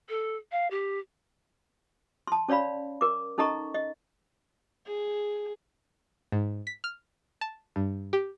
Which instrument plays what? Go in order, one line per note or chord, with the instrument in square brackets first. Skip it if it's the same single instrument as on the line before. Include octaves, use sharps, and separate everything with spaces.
[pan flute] A4
F5
G4
[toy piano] A5 C6
C#4 C#5 D5 F5 B5
A#4 D6
C#4 D#4 A4 D#5 A#5 C#6
D#5
[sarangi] G#4
[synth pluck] G#2
B6
F6
A5
G2
G4